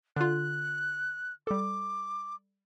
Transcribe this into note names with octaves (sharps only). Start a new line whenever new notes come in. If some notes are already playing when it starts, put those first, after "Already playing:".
D3 F4 F#6
G3 A4 D6